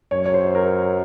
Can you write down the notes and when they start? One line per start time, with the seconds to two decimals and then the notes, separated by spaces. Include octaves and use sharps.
0.11 F#2 C#5
0.25 C#5
0.34 C5
0.55 A#4